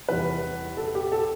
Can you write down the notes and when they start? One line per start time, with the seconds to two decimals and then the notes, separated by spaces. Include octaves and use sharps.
0.09 E2 C3 E3 G3 B4
0.77 A4
0.95 G4
1.12 A4